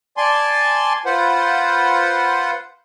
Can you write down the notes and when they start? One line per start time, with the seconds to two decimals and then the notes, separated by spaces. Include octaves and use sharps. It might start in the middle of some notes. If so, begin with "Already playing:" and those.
0.17 D5 G#5 A5 C6
1.06 F4 B4 C5 F#5